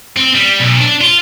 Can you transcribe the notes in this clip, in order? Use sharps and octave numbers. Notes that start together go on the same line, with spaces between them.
C4
G3
B1
D4
F4